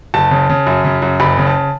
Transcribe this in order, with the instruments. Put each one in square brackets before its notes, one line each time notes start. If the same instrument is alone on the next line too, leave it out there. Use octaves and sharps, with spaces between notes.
[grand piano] F#1 A5
C#3
C#3
F#2
C#3
F#2
F#1 B5
C#3
A5